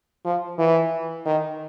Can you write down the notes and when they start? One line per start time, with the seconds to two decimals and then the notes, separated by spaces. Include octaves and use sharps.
0.25 F3
0.59 E3
1.26 D#3